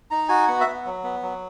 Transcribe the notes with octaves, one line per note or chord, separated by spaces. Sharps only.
D#4 A#5
F#4 G#5
B3 F#5
E5
B3
F#3
B3
F#3